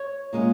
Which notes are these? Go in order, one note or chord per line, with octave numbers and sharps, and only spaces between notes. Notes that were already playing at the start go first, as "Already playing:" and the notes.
Already playing: C#5
A#2 G#3 C#4